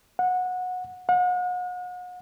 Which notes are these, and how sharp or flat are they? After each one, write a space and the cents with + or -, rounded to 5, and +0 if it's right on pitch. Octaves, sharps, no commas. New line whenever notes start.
F#5 -20
F#5 -40